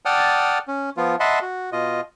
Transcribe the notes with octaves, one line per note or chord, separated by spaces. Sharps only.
D5 F#5 G5 A5 D#6 F6
C#4
F3 B3 F4
D#5 E5 F#5 A5 B5 C6
F#4
B2 F4 D#5